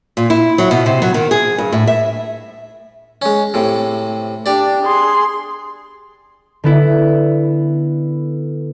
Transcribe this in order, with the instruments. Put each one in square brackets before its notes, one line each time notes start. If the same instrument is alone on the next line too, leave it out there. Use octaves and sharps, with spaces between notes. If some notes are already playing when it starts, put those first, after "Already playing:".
[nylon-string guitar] A#2
E4
F#3
B2
C3
F#3
D#3
G#4
G2
A2
E5
[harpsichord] G#3 C#4
A2 C3
[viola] D4 [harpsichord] G4 D5
[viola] G#4 C6
[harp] D3 B3 E4